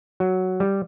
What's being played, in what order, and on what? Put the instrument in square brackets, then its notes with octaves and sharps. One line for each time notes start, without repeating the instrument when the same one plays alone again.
[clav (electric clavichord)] F#3
G3